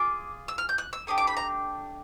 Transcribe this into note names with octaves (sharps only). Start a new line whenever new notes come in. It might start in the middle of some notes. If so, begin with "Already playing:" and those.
Already playing: F4 G#4 D6
E6
F6
G6
F#6
E6
A3 D4 G4 D#6
D6
B5
A#5